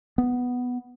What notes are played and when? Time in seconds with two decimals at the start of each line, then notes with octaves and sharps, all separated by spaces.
0.18 B3